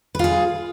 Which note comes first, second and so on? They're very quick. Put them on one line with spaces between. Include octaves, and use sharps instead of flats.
B4 F4 G#4